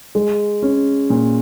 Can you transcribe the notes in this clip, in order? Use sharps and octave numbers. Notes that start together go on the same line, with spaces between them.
G#3
C#4
A#2